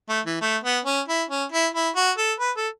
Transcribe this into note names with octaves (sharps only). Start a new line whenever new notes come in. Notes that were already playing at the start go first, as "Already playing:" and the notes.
A3
E3
A3
B3
C#4
E4
C#4
E4
E4
F#4
A4
B4
A4